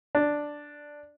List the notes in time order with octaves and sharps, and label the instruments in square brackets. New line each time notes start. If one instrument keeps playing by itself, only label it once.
[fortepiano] D4